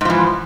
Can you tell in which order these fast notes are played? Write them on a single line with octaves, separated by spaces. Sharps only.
G#2 F3 E3